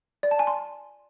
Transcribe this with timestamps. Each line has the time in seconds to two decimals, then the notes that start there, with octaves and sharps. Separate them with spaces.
0.23 D5
0.31 A5
0.39 G#5
0.47 C6